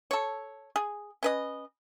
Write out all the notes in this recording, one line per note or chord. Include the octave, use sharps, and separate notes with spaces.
A4 C#5
G#4
C#4 B4 D#5